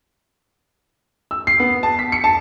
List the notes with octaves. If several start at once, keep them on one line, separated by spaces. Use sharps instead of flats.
E6
C7
B3
A5
B6
C#7
A5